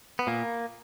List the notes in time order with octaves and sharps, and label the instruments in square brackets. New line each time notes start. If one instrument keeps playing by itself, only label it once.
[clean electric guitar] B3
A#2 A#3